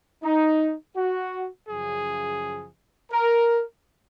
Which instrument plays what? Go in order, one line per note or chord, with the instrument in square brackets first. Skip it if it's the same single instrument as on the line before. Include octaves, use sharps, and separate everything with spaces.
[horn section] D#4
F#4
F#2 C#3 F3 G#4
A#4